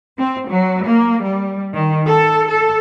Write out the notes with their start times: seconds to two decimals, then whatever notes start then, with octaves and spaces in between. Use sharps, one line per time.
0.18 C4
0.48 F#3
0.84 A#3
1.22 G3
1.74 D#3
2.06 A4
2.47 A4